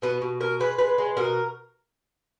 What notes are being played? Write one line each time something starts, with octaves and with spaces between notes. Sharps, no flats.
B2 B3
B2
B2 A#4
G#3 B4
G#3 B4
G#3
B2 A#4